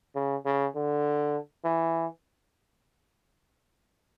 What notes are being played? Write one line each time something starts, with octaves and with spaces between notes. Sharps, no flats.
C#3
C#3
D3
E3